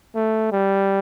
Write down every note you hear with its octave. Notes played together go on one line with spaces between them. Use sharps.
A3
G3